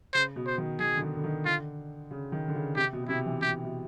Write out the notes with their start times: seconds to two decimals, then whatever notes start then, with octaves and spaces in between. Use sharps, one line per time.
0.14 C#3 C5
0.36 B2
0.47 C5
0.58 D#3
0.79 D#3 G#4
0.97 D3
1.02 D#3
1.16 D3
1.24 D#3
1.45 D3 F4
2.11 C#3
2.32 D#3
2.48 D3
2.55 C#3
2.76 C3 G4
2.93 B2
3.03 B2
3.09 C3 E4
3.26 E3
3.42 C3 G4
3.64 B2